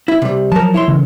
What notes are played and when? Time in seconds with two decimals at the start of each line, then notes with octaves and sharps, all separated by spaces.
0.08 E4
0.22 C3 G3
0.52 F3 F#3 A#4 A5
0.74 E4 C#5 C6
0.88 C#3 E3